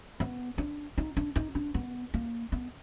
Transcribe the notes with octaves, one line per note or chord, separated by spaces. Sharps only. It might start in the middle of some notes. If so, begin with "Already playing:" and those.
B3
D4
D#4
D4
D#4
D4
B3
A#3
B3